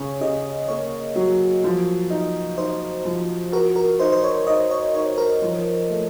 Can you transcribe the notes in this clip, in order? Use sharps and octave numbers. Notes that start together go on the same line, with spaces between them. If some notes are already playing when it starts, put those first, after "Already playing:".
Already playing: C#3 C#5
C#3 D#5
A#3 C#5
F#3
F3
D#4
D#4 C5
F3
F#4 A#4
A#4
D#4 C5
C5
C#5
D#4 D#5
C#5
D#4 C#5
A#4
F3
A3